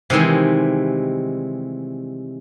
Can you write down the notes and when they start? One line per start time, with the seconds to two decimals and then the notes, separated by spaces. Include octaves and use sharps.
0.10 C3 D#3 E3 G3 G#3